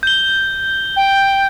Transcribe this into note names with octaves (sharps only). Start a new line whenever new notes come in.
G6 G7
G5